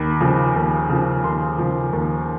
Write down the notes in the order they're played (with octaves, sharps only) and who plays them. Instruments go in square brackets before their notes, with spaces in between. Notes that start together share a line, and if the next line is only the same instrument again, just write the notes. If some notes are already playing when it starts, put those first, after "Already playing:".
Already playing: [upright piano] D#2 B5
C#3 F3
D#2
C#3 F3
D#2 C6
C#3 F3
D#2